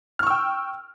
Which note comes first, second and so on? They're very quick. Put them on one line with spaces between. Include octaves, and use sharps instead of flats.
F6 C#6 E6 G5